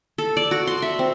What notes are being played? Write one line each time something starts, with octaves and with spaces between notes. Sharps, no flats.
A4
D5
F#4
C6
E5
C4